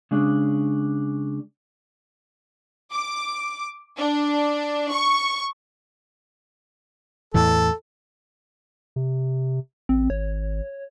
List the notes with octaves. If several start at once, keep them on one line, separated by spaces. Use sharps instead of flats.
C#3 G#3 D4
D6
D4
C#6
E2 A2 E3 A4
C3
A1 C4
G#1 C#5